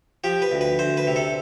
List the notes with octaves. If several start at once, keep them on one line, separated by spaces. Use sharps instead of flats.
F3 G4
B4
D2
B4
D2 C5
B4
C3
A4